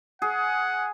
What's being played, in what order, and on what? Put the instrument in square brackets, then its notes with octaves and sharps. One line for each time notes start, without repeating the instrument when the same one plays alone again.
[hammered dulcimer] G#4 [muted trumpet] F#5